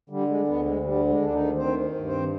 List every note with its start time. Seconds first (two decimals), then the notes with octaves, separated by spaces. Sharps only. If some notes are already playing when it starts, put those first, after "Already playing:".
0.10 D3 G3
0.29 G#3
0.47 D2 B2 B3
0.66 G#3
0.84 D3 G3
1.08 G#3
1.22 D2 D4
1.33 D#3 D#4
1.58 D#3 C4 C5
1.95 G2
2.07 C4 C5